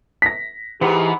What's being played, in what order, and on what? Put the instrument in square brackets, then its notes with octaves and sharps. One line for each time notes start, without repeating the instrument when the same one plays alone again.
[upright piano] A#6 B6
[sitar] G#2 B3 [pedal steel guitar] E3 F#5 A#5 [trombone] G4